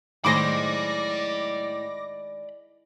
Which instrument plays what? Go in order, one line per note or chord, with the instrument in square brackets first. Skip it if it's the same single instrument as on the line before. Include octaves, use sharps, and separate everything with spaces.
[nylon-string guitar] A2 [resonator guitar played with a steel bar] D#3 G#3 C5 [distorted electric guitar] D5 B5 [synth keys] D6 A#6